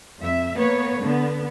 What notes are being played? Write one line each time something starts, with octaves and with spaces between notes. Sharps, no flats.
F2 E5
A#3 B3 B4 C#5
D3 B3